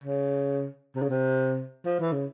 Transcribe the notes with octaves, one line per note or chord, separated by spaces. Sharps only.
C#3
C3
C#3
C3
F3
E3
C#3